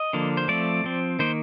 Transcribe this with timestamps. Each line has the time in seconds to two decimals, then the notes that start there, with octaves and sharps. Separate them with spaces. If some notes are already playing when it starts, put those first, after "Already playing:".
Already playing: D#5
0.13 D3 F3 A#3
0.37 C5
0.48 F3 A3 C4 D5
0.84 F3 C4
1.19 D#3 A#3 C5